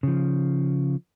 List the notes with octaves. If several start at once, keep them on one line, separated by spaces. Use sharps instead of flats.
C#3 F3